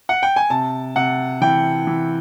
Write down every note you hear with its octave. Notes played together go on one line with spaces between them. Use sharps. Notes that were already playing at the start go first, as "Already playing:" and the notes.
F#5
G5
G#5
C3 A5
C3 F#5
E3 G5
E3